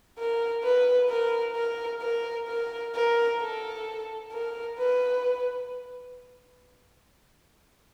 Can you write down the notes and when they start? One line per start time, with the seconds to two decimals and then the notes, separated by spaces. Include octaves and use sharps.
0.18 A#4
0.64 B4
1.09 A#4
1.56 A#4
2.02 A#4
2.48 A#4
2.95 A#4
3.40 A4
4.32 A#4
4.78 B4